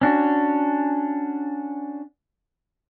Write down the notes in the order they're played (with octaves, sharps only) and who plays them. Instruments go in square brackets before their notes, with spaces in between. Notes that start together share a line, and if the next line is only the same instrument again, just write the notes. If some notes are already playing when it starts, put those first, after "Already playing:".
[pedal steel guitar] C#4 D4 F#4